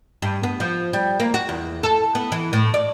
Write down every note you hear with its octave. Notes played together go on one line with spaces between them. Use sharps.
G2
B3
F3
G3
A#3
F#4
E2
A4
B3
E3
A2
D5